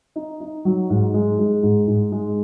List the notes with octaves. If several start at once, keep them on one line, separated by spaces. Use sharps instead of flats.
D#4
D#4
F#3
G#2
G#3
G#3
G#2
G#2
G#3